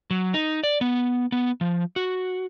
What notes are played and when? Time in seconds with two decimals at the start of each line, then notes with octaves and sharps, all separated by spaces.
0.11 F#3
0.34 D#4
0.64 D5
0.81 B3
1.32 B3
1.61 F3
1.96 F#4